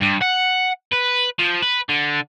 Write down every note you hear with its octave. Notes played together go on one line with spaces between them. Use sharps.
G2
F#5
B4
F3
B4
D3